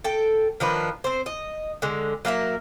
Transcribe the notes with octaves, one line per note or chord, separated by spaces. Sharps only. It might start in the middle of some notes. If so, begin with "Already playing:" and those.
A4 G5
D#3 F3 D4 B4
C4 C5
D#5
D3 G#3
F#3 A#3 A#4 E5